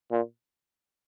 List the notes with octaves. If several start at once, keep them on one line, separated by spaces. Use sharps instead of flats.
A#2